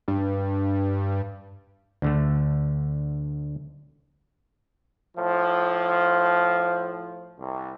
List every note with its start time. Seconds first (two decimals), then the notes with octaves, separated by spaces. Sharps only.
0.08 G2
2.02 D2 D3 A3
5.17 A2 F3
7.39 C2